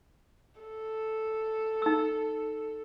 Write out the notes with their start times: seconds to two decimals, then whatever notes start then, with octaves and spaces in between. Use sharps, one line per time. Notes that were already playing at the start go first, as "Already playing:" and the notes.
0.60 A4
1.82 D#4 E6